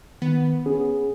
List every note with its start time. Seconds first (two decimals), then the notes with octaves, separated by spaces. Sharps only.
0.22 D#3 B3
0.66 C#4 G#4